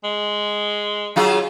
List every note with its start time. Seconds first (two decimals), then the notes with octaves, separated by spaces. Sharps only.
0.04 G#3
1.16 F#3 F4 G#4